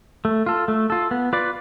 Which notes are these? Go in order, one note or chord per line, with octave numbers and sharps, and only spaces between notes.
A3
F4 A4
A3
F4 A4
B3
F4 B4 D5